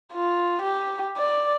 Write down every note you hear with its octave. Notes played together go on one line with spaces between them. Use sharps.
F4
G4
D5